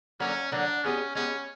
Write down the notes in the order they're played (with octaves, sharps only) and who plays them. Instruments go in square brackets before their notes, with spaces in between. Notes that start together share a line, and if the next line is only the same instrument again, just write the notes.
[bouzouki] D3 F#3 A#3 [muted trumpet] C#4
[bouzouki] D3 F#3 A#3 [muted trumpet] D4
[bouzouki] G#3 B3 D4 G4 [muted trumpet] C#4
[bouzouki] G#3 B3 D4 G4 [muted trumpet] C#4